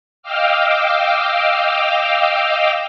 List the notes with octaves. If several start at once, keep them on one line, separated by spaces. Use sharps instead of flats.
D#5 F5 G5 D6 E6 F6